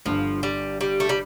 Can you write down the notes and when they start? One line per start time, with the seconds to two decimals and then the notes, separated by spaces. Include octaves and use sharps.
0.05 G1 G2 D3 F3
0.43 G3
0.81 G3
1.00 A3
1.09 G3